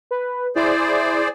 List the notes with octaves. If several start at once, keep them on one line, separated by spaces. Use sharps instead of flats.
B4
E4 G#4 C5 D5